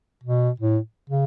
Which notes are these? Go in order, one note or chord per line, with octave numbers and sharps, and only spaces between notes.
B2
A2
C#3